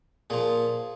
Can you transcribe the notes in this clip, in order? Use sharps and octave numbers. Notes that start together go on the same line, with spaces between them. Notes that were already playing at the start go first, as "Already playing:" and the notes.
A#2 F3 G#4